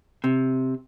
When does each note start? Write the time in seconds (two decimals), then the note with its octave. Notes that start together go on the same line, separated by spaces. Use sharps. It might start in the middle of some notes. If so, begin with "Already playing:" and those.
0.24 C3